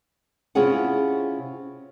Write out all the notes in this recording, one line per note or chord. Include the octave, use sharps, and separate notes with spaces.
C3 C#4 E4 F4 G#4 F#5